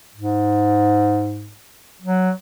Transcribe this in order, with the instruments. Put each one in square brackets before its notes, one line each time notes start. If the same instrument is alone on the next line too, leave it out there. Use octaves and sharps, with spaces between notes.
[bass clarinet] G#2
F#3